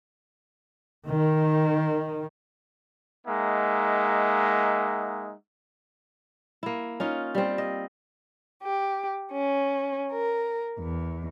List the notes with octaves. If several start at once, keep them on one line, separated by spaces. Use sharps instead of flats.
D#3
G#3 A#3 D#4 E5 F#5
A#3 E4
C#4 D#4 F4
G3 C4
D#5
G4
C#4
A#4
E2